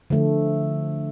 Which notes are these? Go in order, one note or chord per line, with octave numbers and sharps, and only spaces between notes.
D3 F3 A3